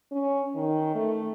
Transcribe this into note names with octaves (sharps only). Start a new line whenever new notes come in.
C#4
D#3
A3